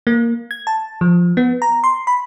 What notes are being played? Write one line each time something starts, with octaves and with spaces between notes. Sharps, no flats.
A#3
G#6
A5
F3
B3
A#5
C6
B5